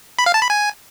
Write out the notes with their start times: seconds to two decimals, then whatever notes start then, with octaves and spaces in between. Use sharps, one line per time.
0.19 B5
0.26 F5
0.34 A5
0.42 B5
0.50 G#5